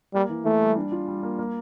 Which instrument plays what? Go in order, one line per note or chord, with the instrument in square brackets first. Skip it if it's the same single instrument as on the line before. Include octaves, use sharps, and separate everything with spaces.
[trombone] G3 [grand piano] A#3
[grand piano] E3
[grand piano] E3 [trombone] A3
[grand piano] G3
D4
F4
G3
A#3
A#3